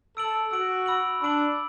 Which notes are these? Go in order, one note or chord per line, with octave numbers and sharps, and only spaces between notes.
A4 E6 D7 F#7
F#4 E6 D7 F#7
B5 E6 D7 F#7
D4 B5 E6 D7 F#7